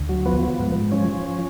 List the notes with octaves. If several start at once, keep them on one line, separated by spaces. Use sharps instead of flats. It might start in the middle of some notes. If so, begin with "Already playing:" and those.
Already playing: D2
F#3
F3 B3
F3
G#2
G#2
F3 C#4
F3